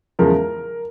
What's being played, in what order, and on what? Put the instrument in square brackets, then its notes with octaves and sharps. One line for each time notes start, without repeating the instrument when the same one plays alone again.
[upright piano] E2 C#3 F3 G#3 A#4